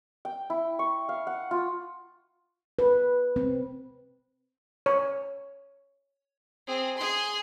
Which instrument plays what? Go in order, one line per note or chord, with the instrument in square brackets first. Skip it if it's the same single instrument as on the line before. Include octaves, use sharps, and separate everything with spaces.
[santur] G5
E4
C#6
F5
F#5
F4
[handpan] B4
C4
[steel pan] C#5
[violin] C4 G#4
G#4 C6